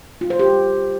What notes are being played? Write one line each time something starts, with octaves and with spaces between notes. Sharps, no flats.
F4
C5
G4